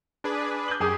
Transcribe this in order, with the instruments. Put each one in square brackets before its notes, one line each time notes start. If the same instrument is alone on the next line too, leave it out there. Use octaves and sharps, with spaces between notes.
[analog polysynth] D4 G#4 B4
[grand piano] G6 F#7
[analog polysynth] F#2 G4 [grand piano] G#4 G#5 D#6